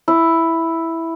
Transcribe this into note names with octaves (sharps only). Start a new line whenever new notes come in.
E4